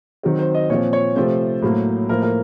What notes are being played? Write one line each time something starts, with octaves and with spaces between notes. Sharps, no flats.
D#3 F#3 C4
C5
D#5
A#2 F3 C4 C#5
C#5
C3 F3 A3 C4 C5
A2 F#3 A#3
A2 F3 A#3 A#4
A#4